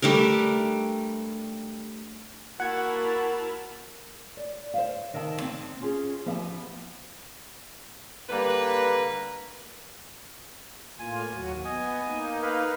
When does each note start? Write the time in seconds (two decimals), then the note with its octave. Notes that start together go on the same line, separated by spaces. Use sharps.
0.02 G3 A3 D4 A#4
2.60 A#3 E4 F#4 A#4 F#5 A5 G#6
4.37 D5
4.74 C5 E5 F5
5.13 C3 D#3 D#5 E5 A5
5.42 C4
5.81 C#4 F4 F#4 G#4
6.26 F3 B3 G4 E5 F5 G#5
8.30 D3 G3 A#3 B4
10.99 A2 A#3 F4 G#5
11.33 D#2 F#3 F#4
11.65 B3 D#5 G#5
12.06 A#3 D#4
12.42 B4 F5